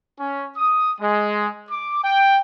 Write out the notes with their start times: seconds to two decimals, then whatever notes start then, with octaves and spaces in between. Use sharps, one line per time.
0.18 C#4
0.56 D#6
1.01 G#3
1.70 D6
2.04 G5